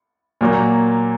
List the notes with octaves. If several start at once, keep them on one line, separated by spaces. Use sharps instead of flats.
A#2 F#3 A#3